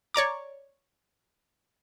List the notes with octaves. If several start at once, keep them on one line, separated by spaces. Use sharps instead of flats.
C#5 D5 A#5 D6